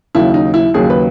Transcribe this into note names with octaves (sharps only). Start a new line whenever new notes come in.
D#2 C#3 F#3 E4
D#4
E4
D#2 C#3 F#3 G#4
B4